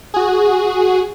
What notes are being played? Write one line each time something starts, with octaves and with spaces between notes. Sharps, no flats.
F#4 G#4